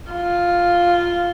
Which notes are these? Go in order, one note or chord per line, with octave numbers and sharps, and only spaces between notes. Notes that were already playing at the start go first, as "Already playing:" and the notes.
F4